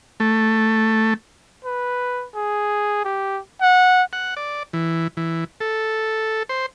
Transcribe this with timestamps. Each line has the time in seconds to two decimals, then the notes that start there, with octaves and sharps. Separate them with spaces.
0.20 A3
1.65 B4
2.35 G#4
3.05 G4
3.61 F#5
4.13 F#5
4.37 D5
4.73 E3
5.17 E3
5.60 A4
6.49 C5